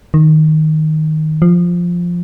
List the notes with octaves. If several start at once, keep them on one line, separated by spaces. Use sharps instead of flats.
D#3
F3